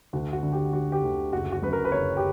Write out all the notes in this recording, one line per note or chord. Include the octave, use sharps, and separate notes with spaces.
D2 F#4
F#4
D3
G4
D3 F#4
G4
D2
F#1 F#4
F#4
F#2 B4
A#4
B4
F#1 C#5
G4